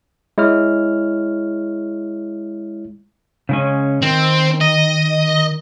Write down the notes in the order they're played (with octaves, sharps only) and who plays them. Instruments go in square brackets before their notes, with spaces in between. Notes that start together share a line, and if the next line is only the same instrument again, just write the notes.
[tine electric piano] G#3 E4 C#5 F6
[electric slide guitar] C#3 G#3 C#4
[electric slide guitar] D#3 [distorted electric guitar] C4
[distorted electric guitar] D#5